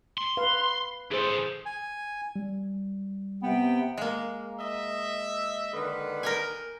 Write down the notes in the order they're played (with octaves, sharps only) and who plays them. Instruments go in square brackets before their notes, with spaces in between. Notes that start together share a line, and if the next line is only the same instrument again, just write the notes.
[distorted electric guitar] C6
[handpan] B4 F5
[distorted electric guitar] E3 A4 [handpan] G#4 C5
[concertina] G#5
[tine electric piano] G3
[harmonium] C3 G5 [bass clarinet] B3
[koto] G#3 A#3
[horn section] D#5 E5
D3 D#3 B4
[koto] A#4 G5 G#5